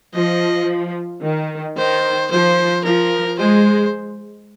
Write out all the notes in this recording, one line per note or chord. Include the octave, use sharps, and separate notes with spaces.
F3 D#5
D#3
D#3 C5
F3 C5
F3 A#4
G#3 C5